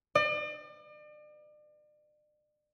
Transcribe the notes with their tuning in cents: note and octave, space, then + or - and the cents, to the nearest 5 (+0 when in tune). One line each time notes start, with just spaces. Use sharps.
D5 +40